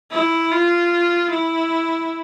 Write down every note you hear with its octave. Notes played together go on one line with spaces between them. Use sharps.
E4
F4
E4